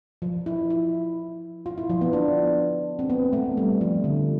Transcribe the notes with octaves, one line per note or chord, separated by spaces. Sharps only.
F3
E4
E4
F4
E4
F3
B3
D4
C4
B3
A3
G3
F3
D3